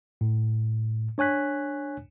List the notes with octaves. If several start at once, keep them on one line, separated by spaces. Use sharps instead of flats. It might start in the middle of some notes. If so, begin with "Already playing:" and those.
A2
D4 C#5 G#5 F#6 B6